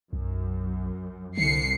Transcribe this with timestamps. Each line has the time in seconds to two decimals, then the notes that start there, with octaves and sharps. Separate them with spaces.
0.13 B1 F#2
1.37 C2 D3 C7 C#7